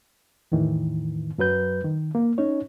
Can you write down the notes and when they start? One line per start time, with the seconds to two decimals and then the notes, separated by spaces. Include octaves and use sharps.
0.52 E2 A2 D#3 E3
1.38 F#2 F#3 B4 G6
1.84 D#3
2.15 A#3
2.38 C#4 D#4 C#5